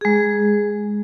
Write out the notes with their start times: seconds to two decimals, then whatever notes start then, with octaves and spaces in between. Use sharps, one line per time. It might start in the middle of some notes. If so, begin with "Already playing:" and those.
0.01 G#3 G#4